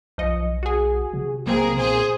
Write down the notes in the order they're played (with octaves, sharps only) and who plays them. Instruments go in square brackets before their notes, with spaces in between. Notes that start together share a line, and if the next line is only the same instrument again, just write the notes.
[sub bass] B1 [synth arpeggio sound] F3 D#5 C#7
[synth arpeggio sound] F#4 G#4
[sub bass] C3
[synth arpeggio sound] B1 A#3 C4 [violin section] G#4 A#4
[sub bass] A#2 [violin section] G#4 C5